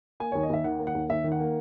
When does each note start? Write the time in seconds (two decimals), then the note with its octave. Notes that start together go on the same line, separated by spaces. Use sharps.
0.20 A#3 G#5
0.32 D#2 C#5
0.43 D#5
0.50 D#2 E5
0.64 D#3 F#5
0.79 A#3
0.87 F#5
0.95 D#2
1.10 D#2 E5
1.24 D#3
1.32 F#5
1.39 A#3